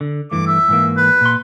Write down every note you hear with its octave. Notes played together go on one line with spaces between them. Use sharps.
D3
G2 E3 A3 D6
E5
G#2 E3 A#3
B4
A#2 C6